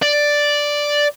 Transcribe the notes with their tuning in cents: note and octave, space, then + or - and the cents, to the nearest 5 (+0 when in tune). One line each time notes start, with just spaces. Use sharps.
D5 +0